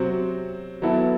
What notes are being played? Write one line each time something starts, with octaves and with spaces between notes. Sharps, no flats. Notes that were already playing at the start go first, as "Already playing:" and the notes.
Already playing: C3 F#3 C4 F#4
F#3 B3 E4 A4